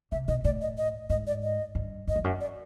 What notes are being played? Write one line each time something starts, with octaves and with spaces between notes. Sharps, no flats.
C3 E5
B2 D#5
A2 D5
D#5
D#5
G#2 D#5
D5
D#5
G2
F#2 D#5
F2
F#2
D5